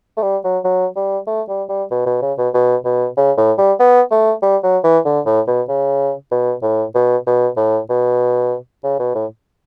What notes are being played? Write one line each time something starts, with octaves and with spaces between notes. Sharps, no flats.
A3
G3
F#3
F#3
G3
A3
G3
G3
B2
B2
C#3
B2
B2
B2
C#3
A2
G3
B3
A3
G3
F#3
E3
D3
A2
B2
C#3
B2
A2
B2
B2
A2
B2
C#3
B2
A2